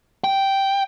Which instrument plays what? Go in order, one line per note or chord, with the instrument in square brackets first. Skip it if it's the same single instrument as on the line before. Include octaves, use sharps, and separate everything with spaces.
[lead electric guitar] G5